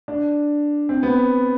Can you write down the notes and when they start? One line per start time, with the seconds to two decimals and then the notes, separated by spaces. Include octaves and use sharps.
0.08 D4
0.89 C4
1.03 B3